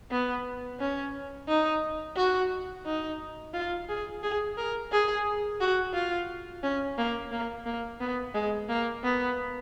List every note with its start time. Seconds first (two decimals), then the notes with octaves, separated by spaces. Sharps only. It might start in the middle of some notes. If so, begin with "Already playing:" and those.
0.11 B3
0.80 C#4
1.48 D#4
2.16 F#4
2.86 D#4
3.54 F4
3.89 G#4
4.23 G#4
4.57 A#4
4.92 G#4
5.61 F#4
5.94 F4
6.63 C#4
6.98 A#3
7.31 A#3
7.66 A#3
8.00 B3
8.34 G#3
8.69 A#3
9.03 B3